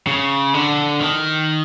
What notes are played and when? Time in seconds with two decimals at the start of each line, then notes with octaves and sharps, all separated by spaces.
0.07 C#3
0.54 D3
1.01 D#3